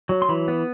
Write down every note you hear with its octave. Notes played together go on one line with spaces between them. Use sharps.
F#3
C6
E3 B5
B3